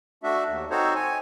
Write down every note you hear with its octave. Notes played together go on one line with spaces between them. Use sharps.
A3 D4 F#4 E5
D#2
C4 D#4 F#4 A4 C5 C#5
C#5 G#5